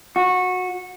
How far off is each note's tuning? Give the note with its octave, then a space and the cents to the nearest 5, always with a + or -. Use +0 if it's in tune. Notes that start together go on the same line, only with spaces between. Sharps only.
F#4 -20